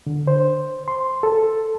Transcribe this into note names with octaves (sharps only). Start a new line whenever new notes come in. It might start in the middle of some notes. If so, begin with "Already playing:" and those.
D3
C5
C6
A4